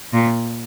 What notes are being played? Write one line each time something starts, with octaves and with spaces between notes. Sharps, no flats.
A#2